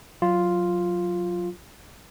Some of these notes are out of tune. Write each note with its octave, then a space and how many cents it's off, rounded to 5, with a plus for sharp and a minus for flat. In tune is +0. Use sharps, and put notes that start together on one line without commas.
F#3 -15 F4 +0